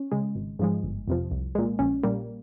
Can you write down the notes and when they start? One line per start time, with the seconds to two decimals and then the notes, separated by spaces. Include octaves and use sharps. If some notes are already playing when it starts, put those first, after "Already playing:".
Already playing: C#4
0.11 C#3 G#3
0.35 G#1
0.59 G#2 F3 G#3
0.83 G1
1.07 F2 C3 F3
1.31 C2
1.55 A#2 G#3
1.79 A#1 C#4
2.03 A#2 G3 A#3